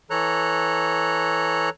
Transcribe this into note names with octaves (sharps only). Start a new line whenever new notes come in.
E3 A4 C#5 A#5 F#6